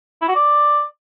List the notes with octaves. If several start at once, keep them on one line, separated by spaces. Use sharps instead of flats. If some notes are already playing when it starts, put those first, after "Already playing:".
E4
F#4
D5